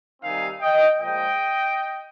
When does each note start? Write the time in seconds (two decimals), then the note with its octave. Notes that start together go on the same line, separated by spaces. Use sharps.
0.21 C3 D#3 G3 C4 D#4 F5 G#5
0.61 D#5 G5
0.99 A#2 F3 G#3 D#5 G5